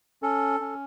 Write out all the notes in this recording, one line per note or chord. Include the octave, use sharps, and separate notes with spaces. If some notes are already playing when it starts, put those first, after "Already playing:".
C#4 A4
C#4